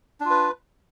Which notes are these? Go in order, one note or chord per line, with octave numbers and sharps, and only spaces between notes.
D4 F4 B4